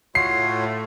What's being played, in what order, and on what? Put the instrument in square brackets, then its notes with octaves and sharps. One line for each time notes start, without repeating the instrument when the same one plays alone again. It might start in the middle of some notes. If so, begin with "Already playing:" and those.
[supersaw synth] A2 A3 [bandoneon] F4 F#4 C#5 [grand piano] C7